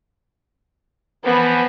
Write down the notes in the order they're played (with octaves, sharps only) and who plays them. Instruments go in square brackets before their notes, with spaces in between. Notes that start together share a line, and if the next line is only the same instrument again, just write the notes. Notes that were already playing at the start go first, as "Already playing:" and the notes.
[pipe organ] E3 F3 [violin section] B3 B5